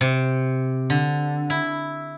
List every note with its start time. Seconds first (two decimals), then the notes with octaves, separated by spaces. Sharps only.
0.01 C3
0.90 D3
1.50 E4